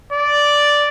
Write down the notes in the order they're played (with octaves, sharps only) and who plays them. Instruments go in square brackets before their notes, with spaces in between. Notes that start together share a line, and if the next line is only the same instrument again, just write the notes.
[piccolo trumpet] D5